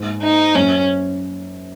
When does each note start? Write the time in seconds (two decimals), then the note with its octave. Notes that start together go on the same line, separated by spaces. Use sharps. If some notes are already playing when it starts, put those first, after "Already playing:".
Already playing: G#2
0.23 D#4
0.55 F#2 C#4